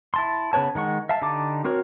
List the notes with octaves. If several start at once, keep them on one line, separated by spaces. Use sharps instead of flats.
E4 A5 C6
C#3 B3 B4 C#5 A5
D#3 G#3 F#5 C#6
E5 F5 A5
D3 D#4 G4 A5 D6
C4 F#4 A#4 C#5